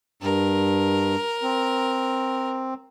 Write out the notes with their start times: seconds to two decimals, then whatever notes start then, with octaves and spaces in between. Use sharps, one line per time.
0.22 G2 A#4
1.42 C4